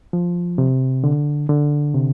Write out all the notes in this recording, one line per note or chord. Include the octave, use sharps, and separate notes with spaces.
F3
C3
D3
D3
C3